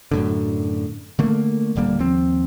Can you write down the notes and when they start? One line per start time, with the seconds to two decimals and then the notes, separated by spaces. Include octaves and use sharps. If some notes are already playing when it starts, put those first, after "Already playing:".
0.11 F#2 A2 D3
1.19 D3 A3 A#3
1.76 D#1 D3 G3 A#3
1.99 D#2 F3 C4